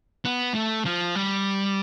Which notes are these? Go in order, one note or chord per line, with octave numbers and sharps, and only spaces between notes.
B3
A3
F3
G3